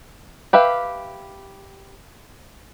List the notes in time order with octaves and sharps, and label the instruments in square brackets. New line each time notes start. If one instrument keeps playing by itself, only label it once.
[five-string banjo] G4 B4 E5 F5